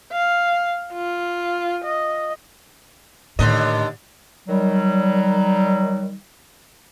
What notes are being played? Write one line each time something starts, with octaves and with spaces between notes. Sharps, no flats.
F5
F4
D#5
D#2 A2 D3 D#5
D#3 F#3 G3